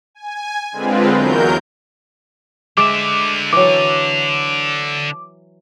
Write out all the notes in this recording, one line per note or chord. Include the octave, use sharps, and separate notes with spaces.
G#5
D3 G#3 C4 F4 B4
E2 F#3 A#4 G6
D3 G#3 E5 D6
E3 F#3 D6